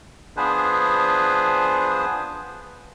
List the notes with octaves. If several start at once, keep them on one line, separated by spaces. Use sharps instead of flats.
F3 B3 D4 G#4 B4 C5